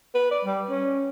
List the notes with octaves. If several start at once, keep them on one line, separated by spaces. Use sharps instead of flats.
B4
D5
G3
C#4